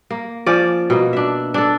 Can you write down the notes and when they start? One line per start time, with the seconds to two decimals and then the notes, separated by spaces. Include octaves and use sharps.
0.11 A#3
0.46 F3 C#4 D5
0.90 B2 A#3
1.13 D4 E5
1.54 D4 A4